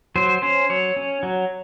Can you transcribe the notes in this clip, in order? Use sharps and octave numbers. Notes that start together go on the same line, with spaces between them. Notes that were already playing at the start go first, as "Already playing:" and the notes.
F#3 C5
C#4 C5
F#3 C#5
C#4
F#3